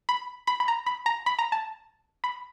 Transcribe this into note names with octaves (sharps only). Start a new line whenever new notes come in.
B5
B5
B5
A#5
B5
A#5
B5
A#5
A5
B5